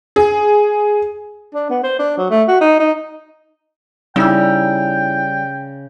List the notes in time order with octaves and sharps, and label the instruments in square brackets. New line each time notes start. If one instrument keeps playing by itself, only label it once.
[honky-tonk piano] G#4
[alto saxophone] D4
B3
C5
D4
F#3
A3
F#4
D#4
D#4
[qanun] C#3 [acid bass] G3 [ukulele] D#4 E4 [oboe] G5